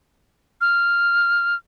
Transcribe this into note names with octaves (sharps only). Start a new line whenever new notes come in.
F6